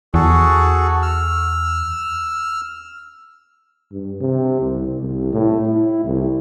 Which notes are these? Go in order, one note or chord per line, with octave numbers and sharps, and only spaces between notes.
E2 F#4 G#4 A4
E6 F6
G2
C3
C2
C2
A2
E4
C2